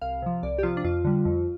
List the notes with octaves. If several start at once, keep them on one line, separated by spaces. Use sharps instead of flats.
C2 F5
C3 F3
C2 D5
G4
C3 F3 F4
D4
F2 F4
D3 G3
F2